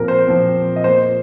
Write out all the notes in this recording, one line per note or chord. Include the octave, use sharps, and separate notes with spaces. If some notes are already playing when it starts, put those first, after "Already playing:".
Already playing: A#2 F3 C4 A#4
C5
A#2 F3 C4
D#5
A#2 A#3 C5